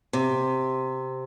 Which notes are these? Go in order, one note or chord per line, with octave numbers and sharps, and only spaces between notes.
C3